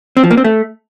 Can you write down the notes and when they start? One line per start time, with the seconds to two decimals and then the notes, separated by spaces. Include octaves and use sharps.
0.17 C4
0.24 F3
0.31 A#3
0.37 C4
0.44 A3